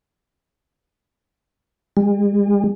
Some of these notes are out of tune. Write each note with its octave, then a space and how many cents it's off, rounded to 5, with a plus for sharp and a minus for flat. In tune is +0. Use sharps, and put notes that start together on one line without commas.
G#3 -45